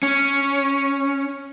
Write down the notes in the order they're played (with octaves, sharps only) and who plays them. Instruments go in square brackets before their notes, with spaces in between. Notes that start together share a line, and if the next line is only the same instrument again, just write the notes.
[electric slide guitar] C#4